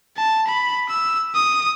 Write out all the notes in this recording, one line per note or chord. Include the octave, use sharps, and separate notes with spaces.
A5
B5
E6
D#6